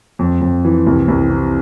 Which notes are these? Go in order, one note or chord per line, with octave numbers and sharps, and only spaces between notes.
F2
F2
E3
C2
C2
C3